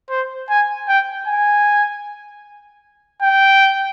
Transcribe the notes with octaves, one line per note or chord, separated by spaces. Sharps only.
C5
G#5
G5
G#5
G5